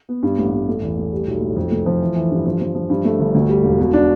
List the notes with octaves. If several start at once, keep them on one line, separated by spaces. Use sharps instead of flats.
B3
G2
A1
A1
A3
E2
A3
G3
B1
A2
F2
F1
F3
E3
E3
G2
F3
F3
F3
G2
A3
G1
D2
G3
E1
B2
D4